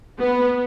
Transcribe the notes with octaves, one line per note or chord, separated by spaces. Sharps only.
B3